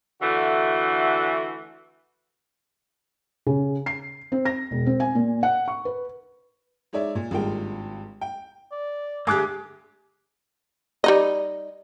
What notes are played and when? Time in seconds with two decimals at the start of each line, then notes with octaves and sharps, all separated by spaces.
0.22 D3 E3 A3 F#4
3.46 C#3
3.86 C7
4.32 C4
4.45 A#6
4.71 E1
4.86 C4
5.00 G#5
5.15 A#2
5.43 F#5
5.68 C#6
5.85 B4
6.93 G#3 D#4 C#5 D5 E5
7.15 A#2
7.31 G#1 G2 G#3 A#3 F4 G5
8.21 G5
8.72 D5
9.27 D3 A3 A#3 G4 G#4 D6 F#6
11.04 G3 D#4 D#5